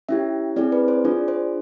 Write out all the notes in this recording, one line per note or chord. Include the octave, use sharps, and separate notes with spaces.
C#4 E4 G4 E5
C4 E4 G#4 D5
B4
C5
D4 F4 G#4 D5
C5